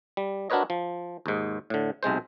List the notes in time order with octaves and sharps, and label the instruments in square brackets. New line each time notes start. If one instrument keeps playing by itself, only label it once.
[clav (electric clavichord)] G3
D4 F#4 A#4 B4 C#5 D#5
F3
D#2 G#2
A2 D3
B1 C3 G#3 C5